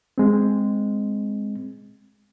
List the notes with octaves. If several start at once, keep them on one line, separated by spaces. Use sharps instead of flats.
G#3 C4